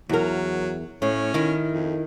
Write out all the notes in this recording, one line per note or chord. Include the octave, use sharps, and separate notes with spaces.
E2 F#3 A#4
A2 C#4
D#3 E4
F2